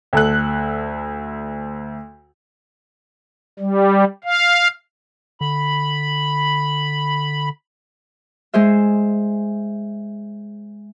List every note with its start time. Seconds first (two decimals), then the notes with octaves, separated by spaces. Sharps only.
0.13 D2 A4 F#6
3.59 G3
4.24 F5
5.41 D3 B5
8.54 G#3 G#4 C5 E5